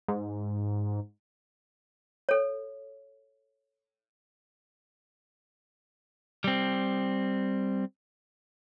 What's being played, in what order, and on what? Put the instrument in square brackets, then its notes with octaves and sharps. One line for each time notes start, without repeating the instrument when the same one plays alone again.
[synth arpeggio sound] G#2
[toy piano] A4 C#5
[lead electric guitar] G3 C4